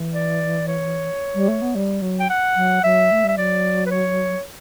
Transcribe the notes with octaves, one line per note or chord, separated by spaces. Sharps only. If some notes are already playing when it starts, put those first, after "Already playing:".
Already playing: E3
D5
C#5
G3
A3
B3
G3
F#3
G5
F#5
F#3
F#3 E5
A3
G3 E5
F#3 D5
B4
C#5